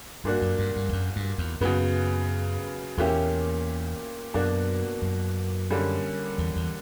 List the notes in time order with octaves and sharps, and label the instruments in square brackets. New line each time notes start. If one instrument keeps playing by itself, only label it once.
[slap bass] G2 [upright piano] A#2 A#3 D4 F#4
[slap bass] F#2
G2
G2
E2
F#2
G2
E2
[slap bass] F#2 [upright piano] C#3 F#3 B3
[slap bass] E2 [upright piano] A#2 A#3 C#4 E4 G4
[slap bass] F#2 [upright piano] B2 A#3 D4 F#4
[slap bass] F#2
[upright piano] D3 G3 A#3 C#4
[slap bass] E2
E2